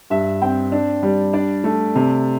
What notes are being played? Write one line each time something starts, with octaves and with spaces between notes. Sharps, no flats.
G2 E5
C4 G5
D4
G3
D4 D5
A3
C3